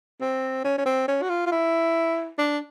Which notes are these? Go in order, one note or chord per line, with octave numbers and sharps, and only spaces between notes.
C4
C#4
C#4
C4
C#4
F#4
F4
F4
E4
D4